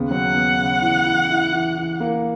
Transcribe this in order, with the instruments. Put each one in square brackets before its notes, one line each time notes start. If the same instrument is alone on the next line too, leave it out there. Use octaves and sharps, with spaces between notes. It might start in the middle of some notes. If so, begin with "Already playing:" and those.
Already playing: [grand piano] D#2 C#3 B3
[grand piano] F#3 [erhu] F#5
[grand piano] B3
C#3
E3
E3
E4
E3
E3
A#3